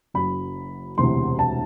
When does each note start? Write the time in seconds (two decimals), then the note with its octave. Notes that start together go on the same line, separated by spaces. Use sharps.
0.14 F#1 F#2 F#3 B5
0.98 E1 D2 C3 E3 C6
1.39 A5